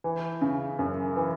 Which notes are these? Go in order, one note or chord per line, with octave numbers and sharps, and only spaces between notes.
E3
C#3
F#2
E3